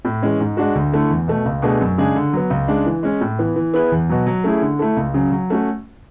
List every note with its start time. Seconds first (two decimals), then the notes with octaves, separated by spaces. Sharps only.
0.05 A2
0.23 E3 G#3 C#4
0.40 G#2
0.57 G#3 D4 F#4
0.75 D2
0.92 D3 A3 E4
1.10 E2
1.28 B2 A3
1.45 C#2
1.62 B2 A3 D4 G#4
1.81 F#2
1.98 C#3 G#3 D4 G#4
2.16 D3
2.33 F#3 B3
2.50 C#2
2.68 C#3 G#3 D4
2.86 E3
3.03 G#3 C#4
3.21 A2
3.39 E3 B3
3.56 E3
3.74 B3 E4 G#4 B4
3.92 E2
4.09 B2 F#3
4.26 F#3
4.44 A3 C#4 E4 G#4
4.62 D3
4.79 A3 E4 A4
4.96 C#2
5.14 C#3 F#3 C#4
5.32 F#3
5.50 A3 C#4 F#4